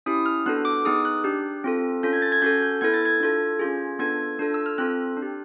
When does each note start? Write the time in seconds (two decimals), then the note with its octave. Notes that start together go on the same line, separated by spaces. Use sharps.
0.06 C#4 E4 G4 D#6
0.26 F6
0.46 B3 D4 F#4 A4 F#6
0.65 D6
0.85 B3 D#4 G#4 D#6
1.05 F#6
1.24 D4 G4
1.64 C4 F4 A4
2.03 C#4 F4 A4 G6
2.13 G#6
2.22 A6
2.32 G#6
2.42 C#4 F#4 A4 G6
2.62 G6
2.81 B3 E4 A4 G#6
2.94 A6
3.05 G#6
3.20 D4 F4 A4
3.59 C#4 F4 G#4
3.99 B3 D4 F4 A4 G#6
4.39 D4 F4 A4
4.54 E6
4.66 F6
4.78 C4 F4 A4 F#6
5.17 D4
5.22 G4